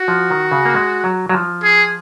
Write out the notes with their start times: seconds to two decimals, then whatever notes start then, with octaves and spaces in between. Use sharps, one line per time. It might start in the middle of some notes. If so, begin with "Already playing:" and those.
Already playing: F#4
0.08 F3
0.30 D#3
0.52 C#3
0.65 A#3
0.74 G#3
1.04 F#3
1.29 F#3
1.34 F3
1.63 G#4